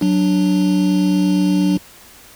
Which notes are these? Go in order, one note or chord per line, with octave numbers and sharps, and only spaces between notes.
F#3 D4